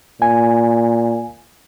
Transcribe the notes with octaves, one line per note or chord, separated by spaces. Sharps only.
A#2 G#5